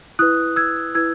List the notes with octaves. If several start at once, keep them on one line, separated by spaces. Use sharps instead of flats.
E4 B4 D#6 F#6
E6 G#6
E4 B4 E6 G#6